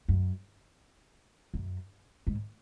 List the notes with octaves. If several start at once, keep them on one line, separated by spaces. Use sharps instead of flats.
F#2
F#2
G#2